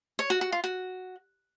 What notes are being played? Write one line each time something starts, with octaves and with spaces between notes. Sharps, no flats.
C#5
F#4
F#4
F4
F#4